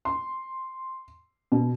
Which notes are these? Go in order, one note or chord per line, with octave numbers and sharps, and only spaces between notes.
C6
B2